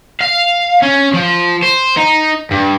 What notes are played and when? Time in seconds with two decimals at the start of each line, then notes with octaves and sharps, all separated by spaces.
0.21 F5
0.82 C#4
1.13 F3
1.63 C5
1.97 D#4
2.51 G2